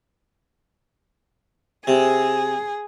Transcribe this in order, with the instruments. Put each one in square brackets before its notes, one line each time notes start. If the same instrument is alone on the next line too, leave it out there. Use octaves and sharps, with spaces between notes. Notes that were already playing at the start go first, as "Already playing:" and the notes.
[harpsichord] C3 [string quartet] G#4